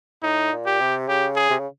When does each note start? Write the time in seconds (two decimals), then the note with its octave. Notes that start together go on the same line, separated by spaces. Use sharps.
0.23 A2 D#4
0.52 A#2
0.67 G4
0.80 C3
1.08 C#3 G4
1.36 G#4
1.50 C3
1.59 C#3